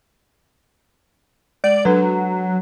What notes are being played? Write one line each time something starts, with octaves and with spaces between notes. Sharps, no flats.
G#3 D5
F#3 D4 A4 B4